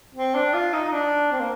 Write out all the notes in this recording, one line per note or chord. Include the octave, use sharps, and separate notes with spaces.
C4
D4
F4
D#4
D#4
D4
C4
A#3